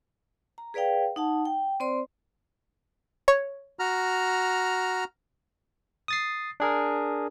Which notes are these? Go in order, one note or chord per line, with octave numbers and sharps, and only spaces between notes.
A#5
G#4 B4 D5 F5 G5
D#4 F#5 A5
G5
C4 C5 D5 C6
C#5
F#4 A#5 F6
D#6 A6 C7
D4 G#4 A#4